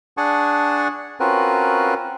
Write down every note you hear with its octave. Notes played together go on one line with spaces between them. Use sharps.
D4 G#4 F#5 G#5 A5 C#6
C4 C#4 F4 F#4 A#4 B4